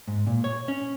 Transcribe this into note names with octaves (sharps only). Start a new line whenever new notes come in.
G#2
A#2
C#5
C#4